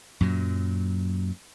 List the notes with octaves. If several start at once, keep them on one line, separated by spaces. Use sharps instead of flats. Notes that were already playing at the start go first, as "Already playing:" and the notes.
F#2 A#2 F#3